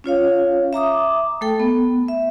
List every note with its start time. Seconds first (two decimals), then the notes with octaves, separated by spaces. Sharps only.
0.04 C#4 F4 C#5 F5
0.73 E5 A#5 D6 D#6
1.41 A3 A4 G5
1.60 B3
2.08 E5